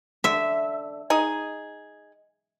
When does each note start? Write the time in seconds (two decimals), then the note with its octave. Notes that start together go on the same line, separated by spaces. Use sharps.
0.24 D3 E5
1.10 D#4 G#4